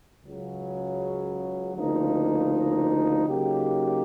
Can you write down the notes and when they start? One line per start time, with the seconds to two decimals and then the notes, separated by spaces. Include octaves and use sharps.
0.24 C#2 C#3 F#3
1.76 D2 C#3 F3 A#3 D#4
3.27 C#3 F#3 A#3 D#4 G4